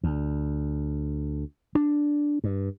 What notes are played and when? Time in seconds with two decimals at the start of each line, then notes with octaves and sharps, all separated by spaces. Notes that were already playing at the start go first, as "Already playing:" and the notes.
0.04 D2
1.75 D4
2.44 G2